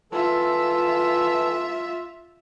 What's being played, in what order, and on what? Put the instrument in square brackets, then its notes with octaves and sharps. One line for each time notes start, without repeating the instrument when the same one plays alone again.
[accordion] E3 A4 [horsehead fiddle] F4 E5